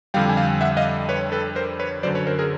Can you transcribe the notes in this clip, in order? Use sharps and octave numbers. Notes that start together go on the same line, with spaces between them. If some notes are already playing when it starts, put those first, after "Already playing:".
F2 D3 G3 F5 G5
G#5
F5 G5
E5 F#5
D#5 F5
B4 C#5
A4 B4
A#4 C5
B4 C#5
F#2 D3 F#3 C5 D5
B4 C#5
A#4 C5
G#4 A#4